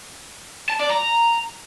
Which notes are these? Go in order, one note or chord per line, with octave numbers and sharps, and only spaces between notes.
A5
D5
A#5